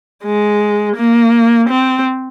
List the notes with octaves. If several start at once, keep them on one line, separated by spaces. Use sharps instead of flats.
G#3
A#3
C4